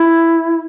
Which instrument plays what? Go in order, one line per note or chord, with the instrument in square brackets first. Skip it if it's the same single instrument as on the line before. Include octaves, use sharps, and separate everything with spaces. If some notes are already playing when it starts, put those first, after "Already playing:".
Already playing: [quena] E4